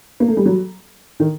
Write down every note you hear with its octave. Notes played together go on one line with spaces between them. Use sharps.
A#3
A3
G3
F#3
D#3